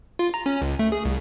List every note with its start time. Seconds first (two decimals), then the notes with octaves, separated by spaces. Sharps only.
0.19 F4
0.34 A#5
0.46 C#4
0.62 C#2
0.79 A3
0.92 G#4
1.05 C2